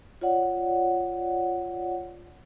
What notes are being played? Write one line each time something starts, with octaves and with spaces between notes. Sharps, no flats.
F4 C#5 D5 F#5